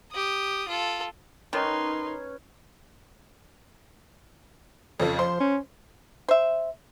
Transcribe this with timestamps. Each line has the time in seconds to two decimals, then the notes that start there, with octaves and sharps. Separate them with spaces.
0.12 G4 D#6
0.68 F4 A4
1.53 D#3 C#4 D#4 B4 C#5 C6
5.00 F2 C#3 F3 A4
5.19 F3 C5 C6
5.40 C#4
6.28 C5 E5